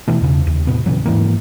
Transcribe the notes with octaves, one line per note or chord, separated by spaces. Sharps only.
B2 E3 A3
E2 C#3
D#2
A2 C3 B3
A#2 C#3 E3 F#3
G#2 E3 A#3